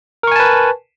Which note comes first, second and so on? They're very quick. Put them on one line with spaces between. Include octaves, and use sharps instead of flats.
A#4 C#6 G#5 A5 B4